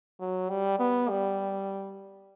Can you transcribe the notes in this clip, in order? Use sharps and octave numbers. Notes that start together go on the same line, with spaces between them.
F#3
G3
B3
G3